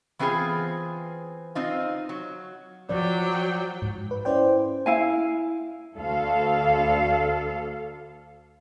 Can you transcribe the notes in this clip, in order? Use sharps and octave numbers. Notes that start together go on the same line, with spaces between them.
E3 B3 C4 F4 G#4
C4 D#4 F4
F#3
F3 F#3 D5 G5
G#2
B4
C#4 E4 C5 D5 G5
E4 F5 G#5
D2 A4 F5